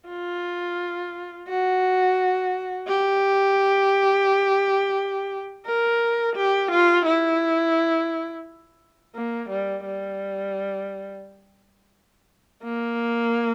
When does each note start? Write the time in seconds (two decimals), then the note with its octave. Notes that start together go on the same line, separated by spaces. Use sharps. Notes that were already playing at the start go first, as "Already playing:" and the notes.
0.09 F4
1.48 F#4
2.87 G4
5.67 A#4
6.36 G4
6.71 F4
7.06 E4
9.15 A#3
9.50 G3
9.85 G3
12.64 A#3